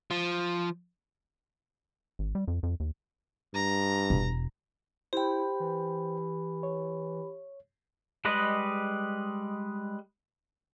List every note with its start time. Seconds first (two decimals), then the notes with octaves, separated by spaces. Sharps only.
0.11 F3
2.19 G#1
2.35 G3
2.48 F2
2.63 F2
2.80 D#2
3.55 G2 A#5
4.10 E1
5.13 E4 G4 C5 G5 B5
5.60 E3
6.63 C#5
8.25 G3 G#3 B4 D#5